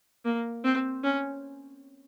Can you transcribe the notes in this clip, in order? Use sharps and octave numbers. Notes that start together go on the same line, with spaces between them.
A#3
C4
C#4